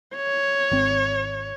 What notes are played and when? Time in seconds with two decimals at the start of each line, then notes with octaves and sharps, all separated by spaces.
0.16 C#5
0.71 G#1 C4